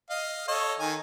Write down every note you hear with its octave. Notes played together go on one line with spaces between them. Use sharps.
D#5 F5
A4 C#5 D#5
D#3 G#5